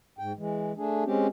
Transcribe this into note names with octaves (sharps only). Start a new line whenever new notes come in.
G#2 G5
E3 G#3
A3 D4 G#4
G#3 C4 C#4 G4